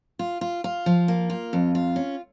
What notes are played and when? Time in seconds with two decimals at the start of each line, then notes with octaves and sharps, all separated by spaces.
0.19 F4
0.41 F4
0.64 F4
0.86 F3
1.08 A#3
1.30 F4
1.53 F2
1.75 F4
1.96 C#4